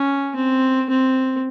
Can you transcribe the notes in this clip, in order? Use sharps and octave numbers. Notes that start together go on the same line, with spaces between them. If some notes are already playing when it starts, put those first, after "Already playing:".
Already playing: C#4
C4
C4